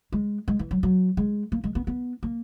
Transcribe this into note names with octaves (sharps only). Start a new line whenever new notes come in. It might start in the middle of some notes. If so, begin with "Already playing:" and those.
G#3
G#3
E3
F#3
F#3
G#3
A#3
G#3
B3
B3
A#3